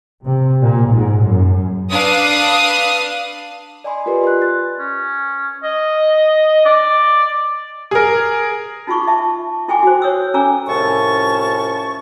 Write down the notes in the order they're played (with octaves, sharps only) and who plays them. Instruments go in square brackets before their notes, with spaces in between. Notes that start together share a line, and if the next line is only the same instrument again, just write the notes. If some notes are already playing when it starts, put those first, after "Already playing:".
[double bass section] C3
A#2
G#2
F#2
[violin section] D4 B4 F5 D#6
[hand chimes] D5 D#5 G#5 B5 C6
F4 G4 A#4 B4 D5
C6 F#6
A6
[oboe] C#4
D#5
D5
[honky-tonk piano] G#4 A#4
[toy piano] D#4 F4 A5 C#6 D6
E5 A5
E4 A4 G5 G#5 C6 D6
F#4 C5
C#5 D#6 E6
C#4 A4 G#5 A#5 D6 E6
[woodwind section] C2 A2 F3 C#4 A5 C#6